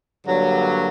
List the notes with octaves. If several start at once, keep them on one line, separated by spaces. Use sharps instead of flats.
G2 D3 F#3 A#3